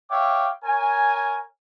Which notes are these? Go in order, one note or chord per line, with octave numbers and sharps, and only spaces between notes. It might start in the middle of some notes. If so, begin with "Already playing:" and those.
C#5 E5 F5 G5 D6
A#4 C#5 G#5